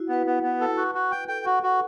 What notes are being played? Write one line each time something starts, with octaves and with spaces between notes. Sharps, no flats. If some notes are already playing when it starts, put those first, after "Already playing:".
Already playing: E4 F#4
B3 B4
B3
B3
A4
F#4
F#4
G5
A4 G5
F#4
F#4